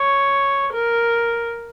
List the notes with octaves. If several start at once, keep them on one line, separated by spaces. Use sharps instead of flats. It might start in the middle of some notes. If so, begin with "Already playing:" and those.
Already playing: C#5
A#4